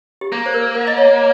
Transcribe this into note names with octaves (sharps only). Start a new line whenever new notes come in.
G4
A#3 G#4
C5
A#4
A#4
D#5
C#5